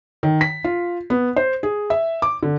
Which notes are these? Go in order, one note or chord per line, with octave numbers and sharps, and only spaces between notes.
D#3
B6
F4
B3
C5
G#4
E5
D6
D3